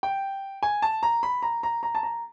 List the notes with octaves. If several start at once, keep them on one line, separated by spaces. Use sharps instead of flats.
G5
G#5
A5
A#5
B5
A#5
A#5
A#5
A5
A#5